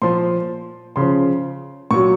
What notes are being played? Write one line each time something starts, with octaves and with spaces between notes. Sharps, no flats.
A#2 F3 C6
C#3 F3 C6
A#2 F#3 C#6